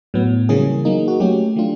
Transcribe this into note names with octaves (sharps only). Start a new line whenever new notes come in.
A2 F#3 B3
C#3 E3 G3 A#3 C#4 G#4
F#3 A#3 D#4
F#4
F#3 A3 C#4 G4
E3 A3 D4 F4